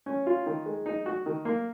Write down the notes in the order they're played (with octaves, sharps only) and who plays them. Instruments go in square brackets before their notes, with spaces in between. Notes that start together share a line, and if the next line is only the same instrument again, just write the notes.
[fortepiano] C#4
F4
D#3
G#3
D#4
F#4
D#3
A#3